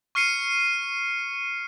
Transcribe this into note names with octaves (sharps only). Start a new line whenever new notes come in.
C#6 F6 C7 C#7 D#7